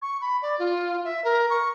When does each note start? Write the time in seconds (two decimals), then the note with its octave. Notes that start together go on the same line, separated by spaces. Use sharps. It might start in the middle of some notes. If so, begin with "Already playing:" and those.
0.02 C#6
0.21 B5
0.42 D5
0.59 F4
1.04 E5
1.24 A#4
1.50 C#6